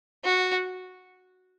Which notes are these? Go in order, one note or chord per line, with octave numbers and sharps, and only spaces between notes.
F#4